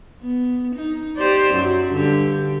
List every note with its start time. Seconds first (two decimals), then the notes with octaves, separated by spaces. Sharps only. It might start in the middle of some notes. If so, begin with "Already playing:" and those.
0.22 B3
0.75 D#4
1.17 G4 C5 D5
1.53 F#2 F#3
1.92 G2 D3 G4